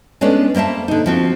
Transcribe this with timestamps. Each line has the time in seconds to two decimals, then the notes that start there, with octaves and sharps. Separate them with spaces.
0.21 G#3 A3 B3 C#4 D4 D5
0.55 G3 A#3 C5 E5 A5
0.88 D3 D#4
1.06 F3 C4 F#4